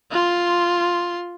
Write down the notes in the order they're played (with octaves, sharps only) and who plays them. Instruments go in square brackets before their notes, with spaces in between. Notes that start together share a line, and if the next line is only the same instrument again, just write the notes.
[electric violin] F4 C6